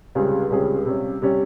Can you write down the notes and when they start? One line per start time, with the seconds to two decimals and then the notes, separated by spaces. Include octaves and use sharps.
0.15 C#2 C3 G3 C#4 G#4
0.50 C#2 C3 G3 C#4 G#4
0.86 C3 G3 C#4
1.22 C3 G3 C#4